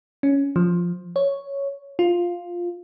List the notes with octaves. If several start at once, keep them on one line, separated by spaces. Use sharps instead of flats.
C#4
F3
C#5
F4